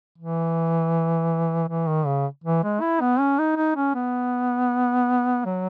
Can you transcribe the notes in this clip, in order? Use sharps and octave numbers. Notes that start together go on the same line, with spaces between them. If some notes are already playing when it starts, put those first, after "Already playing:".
E3
E3
D#3
C#3
E3
G#3
E4
B3
C#4
D#4
D#4
C#4
B3
F#3